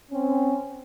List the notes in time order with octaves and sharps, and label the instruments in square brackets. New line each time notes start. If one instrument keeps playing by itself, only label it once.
[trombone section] C4 C#4